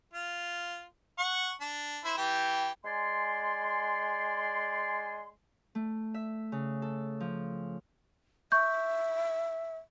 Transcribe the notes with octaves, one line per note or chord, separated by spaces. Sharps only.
F4
F#5 C#6
D4
E4 C5
E3 G4 G5
G#3 D5 G#5 C6
A3
E5
C#3
A4
F3
E5 C#6 G6